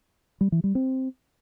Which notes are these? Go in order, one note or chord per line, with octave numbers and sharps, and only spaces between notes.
G3
E3
G3
C4